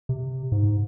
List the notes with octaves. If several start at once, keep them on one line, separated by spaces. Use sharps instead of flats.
C3
G#2